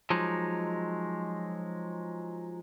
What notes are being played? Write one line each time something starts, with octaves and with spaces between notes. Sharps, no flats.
F3 F#3 G#3 D#4